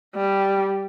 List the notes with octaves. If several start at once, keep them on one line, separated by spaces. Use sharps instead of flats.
G3